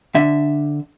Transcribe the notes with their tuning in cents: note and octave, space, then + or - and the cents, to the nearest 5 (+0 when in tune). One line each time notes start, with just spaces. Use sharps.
D3 +0 E5 +0